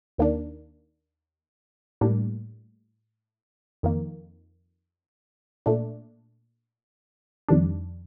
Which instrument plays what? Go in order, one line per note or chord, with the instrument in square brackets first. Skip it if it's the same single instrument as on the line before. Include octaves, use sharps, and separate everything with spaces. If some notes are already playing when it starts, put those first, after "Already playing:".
[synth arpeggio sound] D#2 D#3 A#3 D4
A2 G3 A#3 D4
F2 D#3 A#3
A#2 A3 D4
F2 D#3 G3 D4